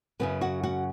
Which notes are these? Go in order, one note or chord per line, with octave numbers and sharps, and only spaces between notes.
F#2 C#3 F#3 B3 B4
F#4 F#5
F#4 F#5